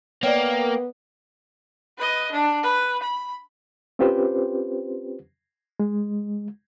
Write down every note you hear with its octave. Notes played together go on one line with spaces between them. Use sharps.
A#3 B3 C#5 D5 G5
B4 D#5
D4
B4
B5
C4 C#4 F4 G4 B4 C5
G#3